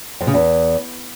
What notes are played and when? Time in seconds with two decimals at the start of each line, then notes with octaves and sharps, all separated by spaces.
0.21 F2
0.27 C#3
0.34 E2